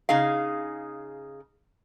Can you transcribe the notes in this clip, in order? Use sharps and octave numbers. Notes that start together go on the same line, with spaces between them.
C#3 D#4 G#4 F5